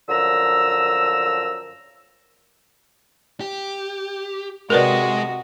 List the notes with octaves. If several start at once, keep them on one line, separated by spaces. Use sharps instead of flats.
F#2 D3 F3 A#5 E6
G4
C3 G#3 F#4 A#4 B4 D5 D#5